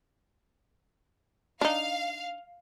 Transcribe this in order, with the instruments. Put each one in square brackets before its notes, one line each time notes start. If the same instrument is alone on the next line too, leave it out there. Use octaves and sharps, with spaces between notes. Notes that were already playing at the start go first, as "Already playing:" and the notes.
[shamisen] D4 D#4 [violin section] F5